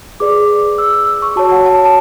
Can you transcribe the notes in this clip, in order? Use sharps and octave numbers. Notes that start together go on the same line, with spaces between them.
G#4 B4 D5 D6
E6
E6
E6
C#6
F#4 C#5 A5
F#5
A5
A5